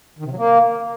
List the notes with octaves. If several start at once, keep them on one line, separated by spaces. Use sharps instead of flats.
D#3
C3
F#3
A#3